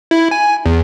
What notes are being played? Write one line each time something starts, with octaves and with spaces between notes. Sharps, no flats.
E4
G#5
E2